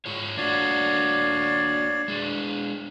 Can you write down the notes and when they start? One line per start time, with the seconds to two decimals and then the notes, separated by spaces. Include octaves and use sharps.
0.06 G#2 F4 C#5 C#6
0.37 A#3 D4 F#4 C#5 D5 F5
2.08 G#3 D4